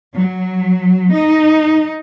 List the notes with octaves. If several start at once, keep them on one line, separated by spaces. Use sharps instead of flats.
F#3
D#4